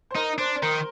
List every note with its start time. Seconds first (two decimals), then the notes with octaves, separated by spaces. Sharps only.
0.11 C5
0.15 D#4 A#4
0.38 D4 C5
0.62 D#3 A#4